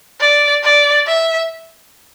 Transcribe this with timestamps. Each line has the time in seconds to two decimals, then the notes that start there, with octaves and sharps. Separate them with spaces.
0.20 D5
0.63 D5
1.07 E5